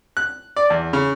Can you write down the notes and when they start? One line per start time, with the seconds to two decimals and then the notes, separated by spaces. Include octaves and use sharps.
0.17 F#6
0.56 D5
0.70 E2
0.93 C#3